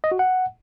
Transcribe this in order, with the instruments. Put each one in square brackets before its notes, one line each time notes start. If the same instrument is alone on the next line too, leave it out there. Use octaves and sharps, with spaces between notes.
[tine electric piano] D#5
F#4
F#5